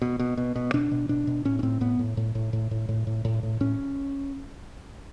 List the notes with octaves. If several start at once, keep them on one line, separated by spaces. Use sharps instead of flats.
B2
B2
B2
B2
B2 D4
B2
B2 D4
B2
A2 C#4
C#4
A2 C4
A2 B3
A2
A2
A2
A2
A2
A2
A2
A2
A2
A2 C#4